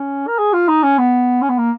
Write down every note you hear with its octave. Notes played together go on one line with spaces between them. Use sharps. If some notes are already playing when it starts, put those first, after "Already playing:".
Already playing: C#4
A#4
G#4
F4
D#4
C#4
B3
C#4
B3
A#3